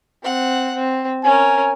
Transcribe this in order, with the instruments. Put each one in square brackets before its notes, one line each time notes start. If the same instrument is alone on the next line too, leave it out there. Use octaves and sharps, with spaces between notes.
[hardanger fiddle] C4 F#5
C4
[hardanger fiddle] C#4 A#4 [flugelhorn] G#5